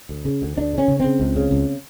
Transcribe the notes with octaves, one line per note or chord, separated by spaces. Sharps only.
D2
C#3
D2
D2 D4
C#3 C#4
C#3
C#3 C4
C#2
C#3
C#2